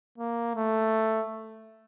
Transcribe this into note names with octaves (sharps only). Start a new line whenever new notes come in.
A#3
A3